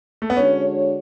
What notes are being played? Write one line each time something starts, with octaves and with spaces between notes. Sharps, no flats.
A3
B3
D3 G#3 C#4 D4 F#4 C#5